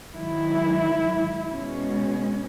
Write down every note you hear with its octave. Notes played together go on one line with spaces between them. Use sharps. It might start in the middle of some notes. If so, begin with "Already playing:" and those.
G#2 D#3 F#3 E4
B2 G#3 C#4